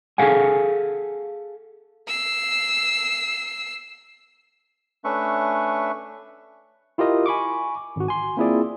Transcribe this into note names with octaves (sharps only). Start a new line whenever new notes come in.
G#4 A4 F5 F#5 G#5
E6 C7
A3 C#4 D4 B4 E5 C#6
E4 F4 G4 A#4 D#5
G#5 B5 C#6 D6
G#1 F#4
G#5 C6
A#3 C4 E4 F4 G#4 D5